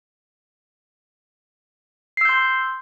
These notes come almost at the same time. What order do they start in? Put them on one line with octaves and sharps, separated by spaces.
C7 E6 G6 C6